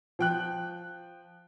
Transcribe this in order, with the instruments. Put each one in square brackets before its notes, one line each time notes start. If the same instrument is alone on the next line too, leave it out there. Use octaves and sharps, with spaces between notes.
[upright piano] F3 G5 F#6